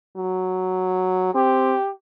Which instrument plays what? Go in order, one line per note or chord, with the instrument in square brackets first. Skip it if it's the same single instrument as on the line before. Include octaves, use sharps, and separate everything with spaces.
[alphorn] F#3
[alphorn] C4 [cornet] G4